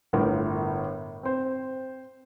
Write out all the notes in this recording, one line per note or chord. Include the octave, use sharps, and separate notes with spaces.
G1 A2 A#4
C4 C5